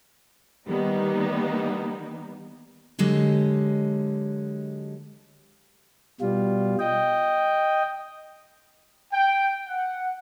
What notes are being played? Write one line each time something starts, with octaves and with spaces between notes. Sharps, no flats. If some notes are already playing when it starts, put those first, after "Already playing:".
D#3 G3 A#3 B3 D#4
D3 F#3 G#3 G4 D#5
B2 G3 F4
D#5 G5
G5
F#5